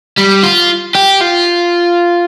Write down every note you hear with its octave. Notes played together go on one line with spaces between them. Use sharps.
G3
F4
G4
F4